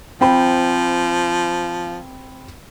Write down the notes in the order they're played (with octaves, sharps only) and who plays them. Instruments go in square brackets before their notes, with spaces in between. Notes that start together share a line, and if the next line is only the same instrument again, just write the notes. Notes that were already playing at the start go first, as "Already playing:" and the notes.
[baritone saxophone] F3 [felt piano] C4 G5 B5